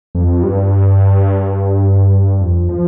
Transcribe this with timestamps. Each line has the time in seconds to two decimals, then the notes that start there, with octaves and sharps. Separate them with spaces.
0.15 F2
0.43 G2
2.41 F2
2.69 F3